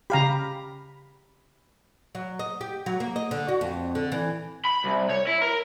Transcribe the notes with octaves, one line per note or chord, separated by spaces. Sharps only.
C#3 G4 F5 A#5 B5
F#3
D#5
G4
F#3
A#3
D#5
D3
F#4
F2
D3
E3
B5
C2
C#5
E4
A#4